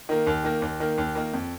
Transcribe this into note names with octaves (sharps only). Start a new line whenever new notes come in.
D#3 A#3
D#2
D#3 A#3
D#2
D#3 A#3
D#2
D#3 A#3
F2